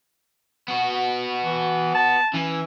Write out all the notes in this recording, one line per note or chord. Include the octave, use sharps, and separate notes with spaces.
B3 F#4
E3
A5
E3 C#4